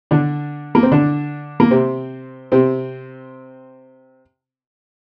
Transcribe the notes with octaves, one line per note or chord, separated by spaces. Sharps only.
D3 D4
A#3
C4
D3 D4
A#3
C3 C4
C3 C4